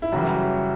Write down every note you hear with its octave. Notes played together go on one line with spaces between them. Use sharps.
E4
F#2 C#3 E3 G3 F#4